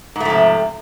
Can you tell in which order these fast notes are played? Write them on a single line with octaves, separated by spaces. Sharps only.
G#2 A3 F3 C3